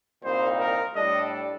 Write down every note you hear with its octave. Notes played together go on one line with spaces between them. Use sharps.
C2 A#2 G3 C4 D#4 C5
A#4
A2 G3 D4 A4 D5 D#5